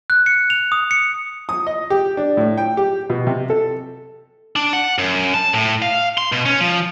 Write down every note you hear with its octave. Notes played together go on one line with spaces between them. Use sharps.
F#6
C#7
F7
D#6
C#7
D#6
D#5
G4
D4
A2
G5
G4
B2
C3
A4
D4
F#5
F#2
A5
A2
F5
C6
B2
C#4
F3